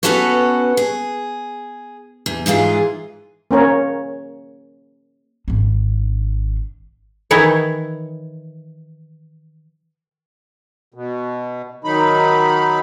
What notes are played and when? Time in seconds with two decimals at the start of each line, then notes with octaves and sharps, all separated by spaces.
0.03 B3 C#4 F#4 A4 B4 C#5
0.77 G#4
2.26 E2
2.46 G#2 E3 F4 G#4
3.51 A#3 C#4 A#4 C#5
5.48 G#1 D4
7.31 D#3 E3 E4 C#5
10.94 B2
11.84 D#3 F#3 D#4 B5